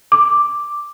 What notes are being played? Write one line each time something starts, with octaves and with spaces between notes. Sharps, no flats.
D6